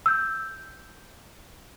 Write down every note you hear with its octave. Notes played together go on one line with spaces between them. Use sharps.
E6 G6